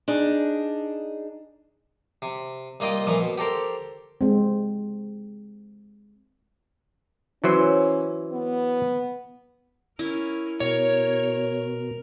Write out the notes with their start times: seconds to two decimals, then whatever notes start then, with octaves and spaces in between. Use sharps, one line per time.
0.08 D4 D#4 G#4
2.22 C3
2.80 C2 A#3 F4 D#5 G5 D#6
3.07 A#2 E3 F3 A#3
3.20 B2
3.38 G4 A4 A#4 C5
4.21 G#3 C4
7.44 E3 F#3 C#4 C5
8.32 B3
9.99 C#4 E4 A#4
10.60 B2 A#4 C#5